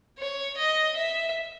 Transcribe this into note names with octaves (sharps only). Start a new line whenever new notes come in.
C#5
D#5
E5